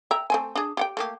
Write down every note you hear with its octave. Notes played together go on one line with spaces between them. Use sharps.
E5 G5 A#5
A3 C4 G#5
D4 G#4
G4 F#5 G5
A3 A#3 G4